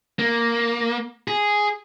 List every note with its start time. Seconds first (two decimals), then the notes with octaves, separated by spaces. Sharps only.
0.19 A#3
1.28 G#4